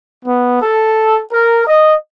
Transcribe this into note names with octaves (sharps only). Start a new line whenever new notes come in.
B3
A4
A#4
D#5